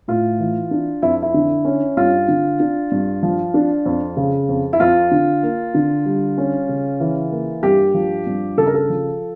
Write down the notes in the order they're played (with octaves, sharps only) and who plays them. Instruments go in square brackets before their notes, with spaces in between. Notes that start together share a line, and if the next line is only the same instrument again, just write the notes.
[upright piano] A2 F4
E3
D4
F2 E4
E4
D3
C#4
G2 F4
D3
D4
G2
F3
D4
F2
C#3
F2
E4
F2 F4
D3
A#3
D3
G3
C#4
C#3
E3
A#3
G2 G4
F3
G2
C#3 A4
A#4
A4
F3